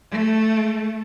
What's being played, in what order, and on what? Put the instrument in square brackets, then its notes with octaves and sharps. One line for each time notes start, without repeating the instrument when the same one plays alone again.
[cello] A3